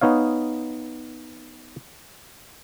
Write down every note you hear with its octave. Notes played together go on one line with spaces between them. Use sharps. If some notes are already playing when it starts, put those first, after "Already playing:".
B3 D#4 C#5 F5